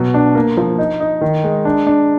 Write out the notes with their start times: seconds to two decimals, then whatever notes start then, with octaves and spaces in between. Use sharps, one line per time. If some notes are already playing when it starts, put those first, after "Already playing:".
Already playing: B2 F#3
0.14 D4
0.35 A#3
0.57 F3
0.78 D#4
1.00 D#4
1.21 D#3
1.44 G#3
1.65 D4
1.87 D4